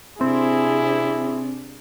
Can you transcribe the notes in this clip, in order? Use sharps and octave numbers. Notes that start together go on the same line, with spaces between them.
C3 C4 D4 E4 G#4